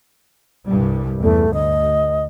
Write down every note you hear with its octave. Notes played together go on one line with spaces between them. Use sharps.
C2 G2 G3
E2 A3
D2 D#5